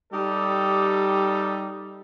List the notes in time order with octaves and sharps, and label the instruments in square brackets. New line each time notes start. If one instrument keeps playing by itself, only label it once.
[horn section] G3 D#4 G4 A4